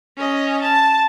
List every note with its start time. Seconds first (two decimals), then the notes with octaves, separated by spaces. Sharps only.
0.17 C#4 D#5
0.63 A5